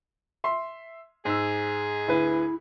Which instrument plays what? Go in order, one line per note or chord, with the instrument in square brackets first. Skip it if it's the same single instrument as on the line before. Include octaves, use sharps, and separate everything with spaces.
[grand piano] E5 C6
[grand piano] G#2 E6 [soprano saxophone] G#4
[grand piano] D2 B4 [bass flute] E4